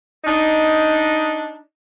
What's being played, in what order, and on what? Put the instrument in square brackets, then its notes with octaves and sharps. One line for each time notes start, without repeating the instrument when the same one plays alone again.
[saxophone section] D4 D#4